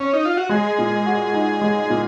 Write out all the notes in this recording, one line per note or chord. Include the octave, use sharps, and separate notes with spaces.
C#4
D#4
F4
F#4
G#3 G#4
A#2
F#4
D#4
G#3
A#2